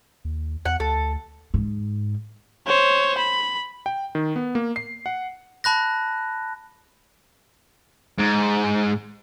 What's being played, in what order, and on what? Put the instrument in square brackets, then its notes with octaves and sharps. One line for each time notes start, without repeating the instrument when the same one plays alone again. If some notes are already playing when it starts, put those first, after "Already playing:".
[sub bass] D#2
[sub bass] E2 [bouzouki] F#5
[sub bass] D2 [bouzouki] A4
[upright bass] G#2
[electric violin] C5 C#5
B5
[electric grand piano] G5
D#3
B3
A#3
C7
F#5
[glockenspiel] A5 B5 F#6 A#6
[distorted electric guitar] G#2